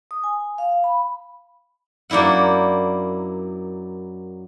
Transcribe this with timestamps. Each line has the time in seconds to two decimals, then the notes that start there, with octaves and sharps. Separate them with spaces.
0.11 D#6
0.24 G#5
0.58 F5
0.84 B5
2.10 F#2 A#3 D4 E4 F#5